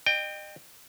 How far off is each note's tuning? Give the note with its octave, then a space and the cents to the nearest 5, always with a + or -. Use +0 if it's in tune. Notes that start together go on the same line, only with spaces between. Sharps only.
D#5 -35 G5 +10